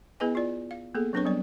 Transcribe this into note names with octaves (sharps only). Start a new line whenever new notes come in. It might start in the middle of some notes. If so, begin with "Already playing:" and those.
B3 E4 G#4 B4 D#5 G#5
F4 D5
F5
A#3 B3 G#4 A4
F#3 C4 D4 B4 C#5 C#6
F#3 G3 B3 D5